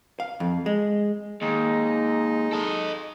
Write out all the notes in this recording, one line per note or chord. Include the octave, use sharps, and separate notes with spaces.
F5
F2
G#3
D#2 G#3 D#4
A4 D#5